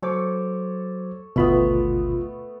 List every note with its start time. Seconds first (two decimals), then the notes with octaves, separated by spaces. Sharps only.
0.03 F#3 A4 C5 C#5 D6
1.36 G#1 D2 B2 A3 B3 F4 B5